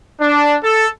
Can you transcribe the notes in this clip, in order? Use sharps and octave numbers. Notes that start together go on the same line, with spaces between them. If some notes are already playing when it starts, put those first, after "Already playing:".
D4
A4